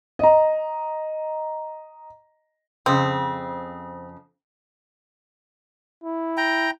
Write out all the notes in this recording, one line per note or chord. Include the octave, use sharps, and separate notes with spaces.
D#5 A#5
F2 C#3 C4
E4
G5 A#5